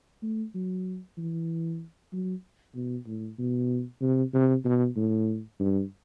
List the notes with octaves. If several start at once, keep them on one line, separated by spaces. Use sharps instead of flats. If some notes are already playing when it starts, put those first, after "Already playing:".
A3
F#3
E3
F#3
B2
A2
B2
C3
C3
B2
A2
G2